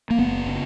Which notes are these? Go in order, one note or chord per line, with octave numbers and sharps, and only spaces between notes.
A#3
F#1 B3
C#3